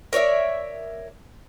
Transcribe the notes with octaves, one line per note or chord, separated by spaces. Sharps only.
A#4 C#5 D5 E5